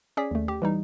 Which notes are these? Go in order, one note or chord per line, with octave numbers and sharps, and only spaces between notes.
C#4 G#4 D5 B6
D#2 A3
G4
E3 G3 D#4